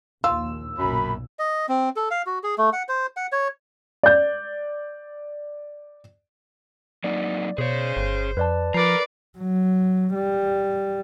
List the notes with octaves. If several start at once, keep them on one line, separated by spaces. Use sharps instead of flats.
A#1 D#2 F4 E6
B1 F#2 A#2 B5
D#5
C4
A4
F5
F#4
G#4
A3
F#5
C5
F#5
C#5
D5 G6
F#3 A#3 D#4 D5
B2 G#4 C5 C#5
G1
F2 B4 D5 A5
F3 A#4 B4 D5 A#5 C7
F#3
G3